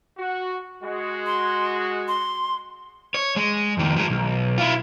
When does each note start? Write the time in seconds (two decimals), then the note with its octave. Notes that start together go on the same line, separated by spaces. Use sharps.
0.18 F#4
0.83 G#3 F#4
1.26 C6
2.08 C6
3.14 C#5
3.36 G#3
3.77 F2 D#3
3.96 D#3 G#3
4.10 B1
4.58 E4 F4